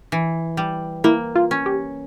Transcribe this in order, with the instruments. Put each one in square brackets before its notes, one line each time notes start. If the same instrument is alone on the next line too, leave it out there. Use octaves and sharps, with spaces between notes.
[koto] E3
G3
[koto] A#3 [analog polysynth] E4
[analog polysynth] F4
[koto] C#4
[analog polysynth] G4